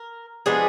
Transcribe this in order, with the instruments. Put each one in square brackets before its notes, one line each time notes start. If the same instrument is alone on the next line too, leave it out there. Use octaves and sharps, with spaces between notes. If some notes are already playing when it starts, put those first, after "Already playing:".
Already playing: [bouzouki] A#4
F3 G#3 B3 D4 G#4